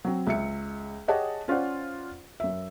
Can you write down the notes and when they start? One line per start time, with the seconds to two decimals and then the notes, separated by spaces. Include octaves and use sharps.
0.05 F#3 C4
0.27 C#2 E5 C#7
1.08 G4 G#4 C#5 D#5 F#5 A5
1.48 C#4 F4 C5 D5 F#5
2.40 F#2 E5